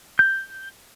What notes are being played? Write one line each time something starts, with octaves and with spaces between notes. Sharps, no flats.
G6